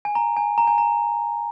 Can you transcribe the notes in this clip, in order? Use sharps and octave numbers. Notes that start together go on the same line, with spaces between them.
G#5
A#5
G#5
A#5
G#5
A#5